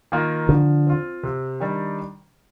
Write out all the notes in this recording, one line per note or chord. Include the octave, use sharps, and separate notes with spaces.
D#3 A#3 F4
D3 F3
C4 F4
C3
D#3 G3 D4